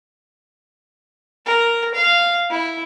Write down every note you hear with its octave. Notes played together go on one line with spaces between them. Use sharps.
A#4
F5
E4